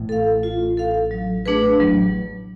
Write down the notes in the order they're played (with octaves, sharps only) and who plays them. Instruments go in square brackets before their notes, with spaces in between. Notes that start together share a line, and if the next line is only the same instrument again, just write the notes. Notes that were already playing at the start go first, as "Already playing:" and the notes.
Already playing: [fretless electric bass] A1 A2
[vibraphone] A4 F5
F4
A4 F5
F#3
A3 D4 G#4 B4
[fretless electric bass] A1 A2 [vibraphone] F#3